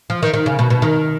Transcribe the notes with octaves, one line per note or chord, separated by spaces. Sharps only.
F3
D#3
D#3
C#3
B2
B2
D#3